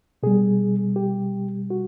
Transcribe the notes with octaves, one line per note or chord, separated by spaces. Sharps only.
B2 G3 G#4
G4
F#4